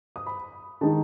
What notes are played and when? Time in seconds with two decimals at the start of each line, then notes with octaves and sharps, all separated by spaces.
0.16 D#6
0.27 B5
0.81 D#3 G#3 D#4 A5